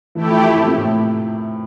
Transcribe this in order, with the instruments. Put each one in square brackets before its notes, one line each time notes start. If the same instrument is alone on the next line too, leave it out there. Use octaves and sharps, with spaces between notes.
[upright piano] E3 [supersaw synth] A3 E4 G4
[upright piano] F3
F3
C3
A#2
A2